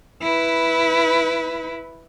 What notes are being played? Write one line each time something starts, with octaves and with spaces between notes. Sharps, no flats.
E4 B4